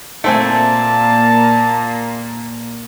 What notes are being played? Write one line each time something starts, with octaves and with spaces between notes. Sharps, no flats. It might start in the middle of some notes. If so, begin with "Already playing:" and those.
A#2 A3 A#3 C4 G#5 A5